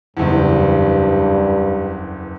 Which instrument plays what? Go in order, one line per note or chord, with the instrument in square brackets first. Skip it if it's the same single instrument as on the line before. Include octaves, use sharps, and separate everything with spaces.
[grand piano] F#1 E2 [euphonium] G2